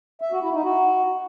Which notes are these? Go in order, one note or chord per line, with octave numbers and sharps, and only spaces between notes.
E5
F#4
E4
D#4
F#4